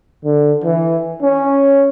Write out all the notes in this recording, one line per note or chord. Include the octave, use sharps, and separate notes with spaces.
D3
E3
C#4